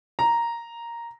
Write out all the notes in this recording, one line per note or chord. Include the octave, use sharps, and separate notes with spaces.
A#5